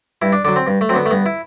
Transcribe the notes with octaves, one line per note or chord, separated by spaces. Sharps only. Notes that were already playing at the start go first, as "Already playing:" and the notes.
G2 E4
D4
D3 F#3 D4
C4
G2
A3
D3 F#3 B3 C4
A3
G2 B3
E4